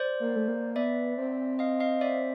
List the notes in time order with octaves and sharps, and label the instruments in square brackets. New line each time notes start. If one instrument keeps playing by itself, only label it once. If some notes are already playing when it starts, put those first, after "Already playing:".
Already playing: [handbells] C5 D5
[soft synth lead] A#3
A3
A#3
[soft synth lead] B3 [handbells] D5 E5
[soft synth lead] C4
[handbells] D#5 F5
D#5 F5
D5 E5